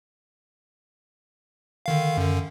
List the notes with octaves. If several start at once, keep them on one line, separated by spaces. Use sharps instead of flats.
D3 D#3 F5
F#2 D3